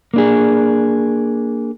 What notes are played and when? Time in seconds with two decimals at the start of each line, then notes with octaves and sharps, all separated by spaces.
0.14 A#3 D4 G#4